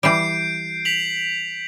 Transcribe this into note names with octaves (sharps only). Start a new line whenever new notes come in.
E3 G3 G6 C7 D7
B6 F7 F#7